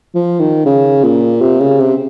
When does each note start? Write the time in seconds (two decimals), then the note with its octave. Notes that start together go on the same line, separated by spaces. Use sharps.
0.15 F3
0.40 D#3
0.66 C#3
1.04 A#2
1.41 C3
1.60 C#3
1.80 C3